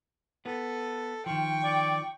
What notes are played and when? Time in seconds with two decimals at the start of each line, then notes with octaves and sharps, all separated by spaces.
0.46 B3 A4
1.26 D#3 F3 G5 C#6
1.64 D5